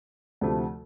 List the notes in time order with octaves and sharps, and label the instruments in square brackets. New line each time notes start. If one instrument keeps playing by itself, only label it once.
[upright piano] D2 C3 F3 A3